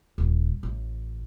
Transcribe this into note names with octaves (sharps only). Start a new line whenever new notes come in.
D#1
A1